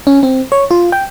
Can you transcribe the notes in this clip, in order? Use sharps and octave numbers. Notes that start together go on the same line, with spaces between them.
C#4
C4
C#5
F4
G5